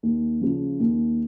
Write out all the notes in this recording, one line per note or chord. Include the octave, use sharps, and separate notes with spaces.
D#2
C#3 F3
D#2